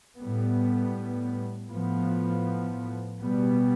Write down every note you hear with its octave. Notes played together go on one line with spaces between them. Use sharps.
A2 G3 B3
A2 F3 B3
B2 G3 B3